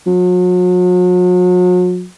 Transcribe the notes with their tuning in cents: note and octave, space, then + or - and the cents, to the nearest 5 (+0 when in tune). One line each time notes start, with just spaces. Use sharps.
F#3 -40